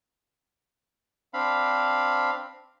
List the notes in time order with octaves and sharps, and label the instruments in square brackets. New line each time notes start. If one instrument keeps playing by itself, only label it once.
[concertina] C4 D4 F5 B5